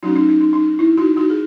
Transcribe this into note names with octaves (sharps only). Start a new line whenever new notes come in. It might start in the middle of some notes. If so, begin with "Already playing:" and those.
F#3 A3 C#4 D#4 F#4
D#4
D#4
D#4
D#4
E4
D#4 F#4
D#4 F#4
G#4